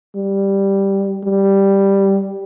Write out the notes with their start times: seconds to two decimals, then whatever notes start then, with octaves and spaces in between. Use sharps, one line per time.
0.16 G3
1.24 G3